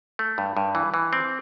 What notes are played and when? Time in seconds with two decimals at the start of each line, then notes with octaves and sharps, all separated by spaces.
0.19 A3
0.38 G2
0.57 G2
0.75 E3
0.94 E3
1.13 C4